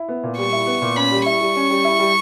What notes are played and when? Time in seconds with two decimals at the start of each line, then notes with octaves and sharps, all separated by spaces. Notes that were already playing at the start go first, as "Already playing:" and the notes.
Already playing: E4
0.09 B3
0.23 A#2
0.38 G3 C#6
0.53 E4
0.66 B3
0.82 A#2
0.96 C#4 B5
1.12 G3
1.26 E4 C#6
1.41 G3
1.56 C#4
1.70 G3
1.85 E4
2.00 G3